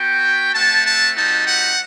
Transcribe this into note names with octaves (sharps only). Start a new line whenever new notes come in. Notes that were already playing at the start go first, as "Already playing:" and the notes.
Already playing: B3 F#4 G5
A3 C4 F#4 A5
A5
G3 C4 D#4 F#4 A5
F#5